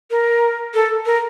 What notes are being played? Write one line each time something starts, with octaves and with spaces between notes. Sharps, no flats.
A#4
A4
A#4